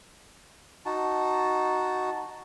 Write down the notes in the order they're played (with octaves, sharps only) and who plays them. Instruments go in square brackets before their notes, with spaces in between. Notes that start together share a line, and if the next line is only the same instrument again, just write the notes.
[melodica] D#4 F#4 A5